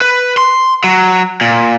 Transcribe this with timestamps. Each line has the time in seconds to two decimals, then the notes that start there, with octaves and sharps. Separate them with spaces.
0.01 B4
0.37 C6
0.84 F#3
1.41 A#2